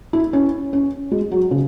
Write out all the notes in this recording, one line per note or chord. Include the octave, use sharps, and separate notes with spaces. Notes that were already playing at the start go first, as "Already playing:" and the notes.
E4
C#4
C#4
G#3
F#3
C#3